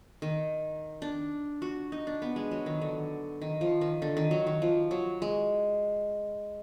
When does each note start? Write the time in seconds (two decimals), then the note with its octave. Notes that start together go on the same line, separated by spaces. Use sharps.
0.22 D#3
1.02 D4
1.62 F#4
1.92 D#4
2.07 D4
2.22 B3
2.36 G#3
2.51 F#3
2.66 D#3
2.81 D3
3.42 D#3
3.61 F3
3.81 D#3
4.02 D3
4.17 D#3
4.31 F#3
4.47 D#3
4.62 F3
4.91 F#3
5.22 G#3